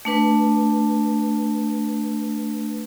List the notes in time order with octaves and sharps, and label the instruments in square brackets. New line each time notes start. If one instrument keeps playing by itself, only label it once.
[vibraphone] A3 D4 B4